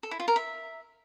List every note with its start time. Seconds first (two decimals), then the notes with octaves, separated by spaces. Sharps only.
0.03 A4
0.11 E4
0.20 F4
0.28 A#4
0.36 E5